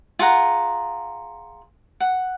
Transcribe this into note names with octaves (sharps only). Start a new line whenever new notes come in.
F4 G#4 F#5 A#5
F#5